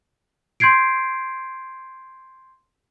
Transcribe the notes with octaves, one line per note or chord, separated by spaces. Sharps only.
C6 G6 G#6 C7 D7